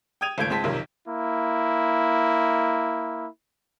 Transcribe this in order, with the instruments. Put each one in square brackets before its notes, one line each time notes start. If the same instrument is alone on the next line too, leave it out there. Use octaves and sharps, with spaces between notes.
[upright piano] G5 D#6 G#6 D#7 F7
G#1 C#2 A3 G6 G#6 D7
C#2 G#3 C4 A5 B6
B1 F2 C3 D#3
[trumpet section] A#3 E4